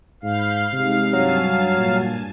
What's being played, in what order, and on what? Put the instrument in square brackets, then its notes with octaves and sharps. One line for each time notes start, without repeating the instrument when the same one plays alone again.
[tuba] G#2 [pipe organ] F5 [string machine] B5 G6
[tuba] C3 [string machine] G#3 D#4
[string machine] G2 G#5 A5 [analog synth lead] F#3
[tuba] A#2